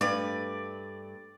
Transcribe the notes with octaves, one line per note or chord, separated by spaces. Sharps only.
G2 A3 B4 D5